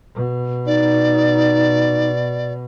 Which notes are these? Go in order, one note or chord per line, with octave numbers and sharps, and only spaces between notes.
B2
D#4 D5